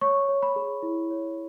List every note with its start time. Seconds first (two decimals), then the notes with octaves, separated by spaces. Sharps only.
0.01 C#5 C#6
0.29 C#5
0.43 B5
0.56 G#4
0.82 E4
1.10 C#5